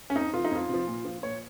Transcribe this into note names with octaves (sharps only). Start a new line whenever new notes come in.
C#4
F2 D#4
C3 F3 F4
D#4
F2 F4
C3 F3
A#2
F3
A#2 C#5